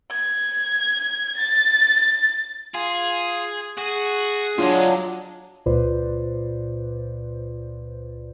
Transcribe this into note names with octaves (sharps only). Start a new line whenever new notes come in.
G#6
A6
F4 G#4
F#4 G#4
F2 F#3 G#3 D4 F4
C#2 A#2 F4 B4 C5 D5